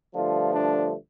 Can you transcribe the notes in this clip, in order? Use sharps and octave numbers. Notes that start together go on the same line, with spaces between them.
G2 D3 F3 A3 F4
D4